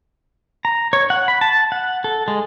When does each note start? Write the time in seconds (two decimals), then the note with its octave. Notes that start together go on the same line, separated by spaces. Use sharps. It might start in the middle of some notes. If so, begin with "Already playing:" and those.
0.65 A#5
0.93 C#5
1.10 F#5
1.28 B5
1.41 A5
1.72 F#5
2.04 A4
2.28 G#3